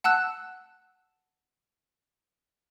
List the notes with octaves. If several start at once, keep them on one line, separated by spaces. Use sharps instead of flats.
F#5 A5 E6 F#6